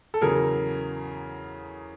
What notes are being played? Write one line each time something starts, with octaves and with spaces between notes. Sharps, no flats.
A4
E2 C#3 F#3 G#4 A#4